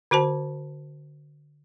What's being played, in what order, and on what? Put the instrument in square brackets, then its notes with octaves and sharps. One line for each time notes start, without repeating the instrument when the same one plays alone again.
[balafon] D3 F#4 C5 A5